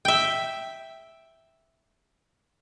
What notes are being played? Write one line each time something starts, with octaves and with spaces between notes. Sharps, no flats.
E5 G5